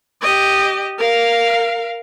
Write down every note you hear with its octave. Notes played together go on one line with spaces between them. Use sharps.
G4 D#5
A#4 F5